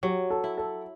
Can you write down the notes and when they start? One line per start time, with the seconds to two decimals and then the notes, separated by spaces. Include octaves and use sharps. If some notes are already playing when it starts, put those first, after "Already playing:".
0.03 F#3 G4
0.30 A4
0.44 E4
0.58 A4